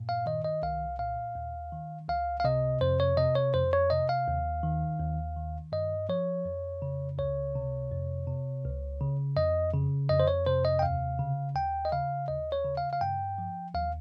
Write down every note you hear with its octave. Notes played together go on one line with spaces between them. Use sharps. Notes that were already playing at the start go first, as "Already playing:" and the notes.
Already playing: G2 A#2
F5
D#3 D#5
D#5
C2 F5
A#2 F5
D#2
D#3
C#2 F5
F5
C3 D#5
F2 C5
C#5
C3 D#5
C#5
F2 C5
C#5
C3 D#5
F5
D#2
D#3
D#2
D#3
G2 D#5
F3 C#5
F2
C#3
C#2 C#5
C3
F2
C3
C#2
C#3
F2 D#5
C#3
F2 D#5
C5
C#5
C3 C5
D#5
G5
D#2 F5
C#3
D#2 G5
D#5
C#3 F5
D#2 D#5
C#5
C#3
F5
F5
G2 G5
F3
D#2 F5